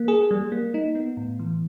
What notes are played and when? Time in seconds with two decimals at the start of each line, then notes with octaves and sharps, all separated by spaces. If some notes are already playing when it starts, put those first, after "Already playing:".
Already playing: A#3
0.08 G#4
0.31 G3
0.52 A#3
0.74 D#4
0.95 B3
1.17 A2
1.39 E3